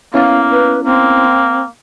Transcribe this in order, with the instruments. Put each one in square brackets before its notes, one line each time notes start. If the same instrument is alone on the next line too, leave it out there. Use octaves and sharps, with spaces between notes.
[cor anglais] A#3 [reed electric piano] B3 C#4 E4 [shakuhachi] F5
[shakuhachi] B4
[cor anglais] A#3 [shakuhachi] C4